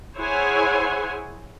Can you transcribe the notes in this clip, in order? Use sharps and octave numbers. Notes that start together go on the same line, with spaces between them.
E4 G#4 C5 C#5 F#5 G#5